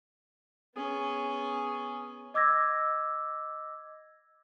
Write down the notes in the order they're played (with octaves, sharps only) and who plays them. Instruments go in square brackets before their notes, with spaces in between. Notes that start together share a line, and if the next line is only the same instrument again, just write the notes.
[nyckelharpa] B3 C#4 [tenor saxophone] G#4
[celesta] D#5 D6 E6 G#6 A#6